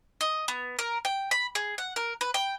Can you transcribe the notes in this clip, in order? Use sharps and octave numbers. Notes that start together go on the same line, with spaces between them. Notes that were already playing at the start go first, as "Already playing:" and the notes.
D#5
B3
A#4
G5
B5
G#4
F#5
A#4
B4
G5